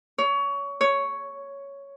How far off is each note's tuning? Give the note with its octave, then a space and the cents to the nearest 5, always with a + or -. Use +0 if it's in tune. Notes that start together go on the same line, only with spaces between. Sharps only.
C#5 +25
C#5 +5